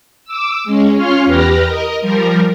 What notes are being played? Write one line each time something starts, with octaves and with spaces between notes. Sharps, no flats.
D6 E6
G#3 C#4
C#4 F4 C#5 C6 F6
E2 G4 B4 F6 A#6
A#4 D#5
F3 G3 A#4